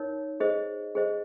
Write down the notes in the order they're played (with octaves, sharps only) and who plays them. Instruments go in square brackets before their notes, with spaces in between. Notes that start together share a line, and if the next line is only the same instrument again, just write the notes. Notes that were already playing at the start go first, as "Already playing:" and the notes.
Already playing: [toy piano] D#4 A#4 C#5
G#4 C5 D#5
G#4 C5 D#5